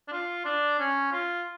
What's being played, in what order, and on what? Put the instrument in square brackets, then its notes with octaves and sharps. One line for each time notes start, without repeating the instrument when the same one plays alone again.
[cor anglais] D4
F4
D4
C#4
F4